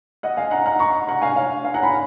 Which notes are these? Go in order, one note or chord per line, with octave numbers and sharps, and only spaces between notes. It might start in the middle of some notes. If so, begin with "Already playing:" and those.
D#5 F#5
F5 G#5
F#5 A#5
F#5 A#5
A#5 C#6
F#5 A#5
F5 G#5
C#5 F5
F5 G#5
F#5 A#5
G#5 B5